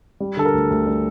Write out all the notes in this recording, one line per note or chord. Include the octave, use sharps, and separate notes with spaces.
G3
D3 A4
A#4
D2
D2
G3